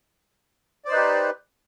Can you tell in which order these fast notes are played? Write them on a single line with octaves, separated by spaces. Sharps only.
D5 C5 D#4 B4 G4